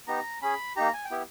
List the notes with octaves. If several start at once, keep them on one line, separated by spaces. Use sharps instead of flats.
B3 D#4 G4 A#5
C#4 G#4 B5
A#3 D#4 G4 A#5
G#5
G5
B3 E4 G4